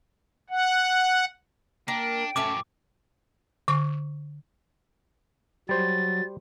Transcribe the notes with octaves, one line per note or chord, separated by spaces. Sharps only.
F#5
A#3 D4 G5
F#2 A2 A3 C#4 E4 D6
D3 C#6
F#3 G3 C5 A6